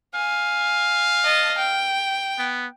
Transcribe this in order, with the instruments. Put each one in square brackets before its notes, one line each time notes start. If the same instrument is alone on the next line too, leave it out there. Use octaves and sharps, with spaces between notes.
[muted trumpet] F5 [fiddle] G#5
[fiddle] D#5 A5
G5
[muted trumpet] B3